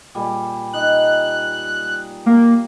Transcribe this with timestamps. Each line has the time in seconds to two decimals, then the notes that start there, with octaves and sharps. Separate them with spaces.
0.15 A#2 G3 G#5
0.73 D#4 F#6
2.26 A#3